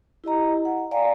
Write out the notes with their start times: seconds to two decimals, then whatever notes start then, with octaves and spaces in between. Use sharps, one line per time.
0.24 E4 G4 D#5 A#5
0.65 F#5
0.91 D5 F5 G5 G#5 A#5